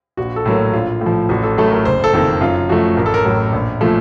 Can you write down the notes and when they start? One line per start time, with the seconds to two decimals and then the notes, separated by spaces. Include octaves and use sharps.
0.17 A#1 F#4
0.36 A4
0.46 A2 F#3 A#3
0.73 A#1 F4
1.01 A2
1.06 F3
1.29 A1 F#4
1.43 A4
1.57 A2 F#3 A3 A4
1.71 A#4
1.85 F#1 C5
2.04 A4
2.13 F2 D#3 A#3
2.41 F#2 F4
2.69 F3 A3 F#4
2.97 A1 A#4
3.06 A4
3.14 A#4
3.25 A2 F#3 A#4
3.53 A#1
3.81 A#2 F3 A3